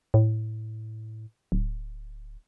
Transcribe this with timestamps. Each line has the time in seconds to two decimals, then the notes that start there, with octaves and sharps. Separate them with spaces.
0.14 A2
1.52 D1